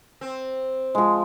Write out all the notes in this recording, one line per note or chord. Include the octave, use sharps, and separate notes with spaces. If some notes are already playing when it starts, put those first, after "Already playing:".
C4
F3 G#3